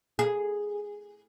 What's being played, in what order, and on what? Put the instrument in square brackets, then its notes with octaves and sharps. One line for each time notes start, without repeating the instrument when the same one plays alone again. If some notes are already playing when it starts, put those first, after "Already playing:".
[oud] G#4